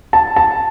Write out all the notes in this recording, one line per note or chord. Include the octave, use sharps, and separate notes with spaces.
A5
A5